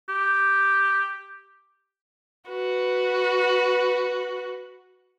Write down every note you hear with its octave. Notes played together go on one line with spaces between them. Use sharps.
G4
F#4 B4